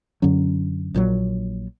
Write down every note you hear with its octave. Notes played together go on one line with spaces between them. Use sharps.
F#2 D3 F#3 C#4
A#1 A#2 F#3